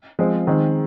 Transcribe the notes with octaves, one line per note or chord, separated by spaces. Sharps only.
F3 G#3 C4
D#3 G#3 C4